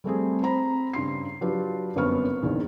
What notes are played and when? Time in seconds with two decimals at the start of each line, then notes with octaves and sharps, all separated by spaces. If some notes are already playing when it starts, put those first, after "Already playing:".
0.04 G3 A3 C4 G#4
0.41 C4 C5 A#5 B5
0.93 G2 C#3 C6 C7
1.41 F#3 D4 F4 G4 B4
1.96 G1 F#2 B3 C4 C#6 F6
2.42 A#1 E2 D#3